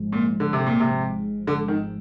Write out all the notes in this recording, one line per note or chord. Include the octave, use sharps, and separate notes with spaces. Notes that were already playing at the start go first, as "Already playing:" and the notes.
Already playing: G#1 G#2 F3 G#3
A#2
D3
C3
A#2
C3
D3
D#3